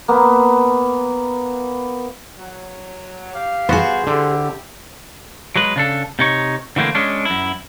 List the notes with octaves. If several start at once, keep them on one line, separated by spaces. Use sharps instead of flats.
A#3 B3
F#3
G4 F5
B3 F#4 G#4 C5
D3 E4 G4
F#3 G#3 B4
C#3 D4 A4
C3 D#4 C#5
D3 E3 A3 A#3 C4
G#3 C#4 D4
F#2 E4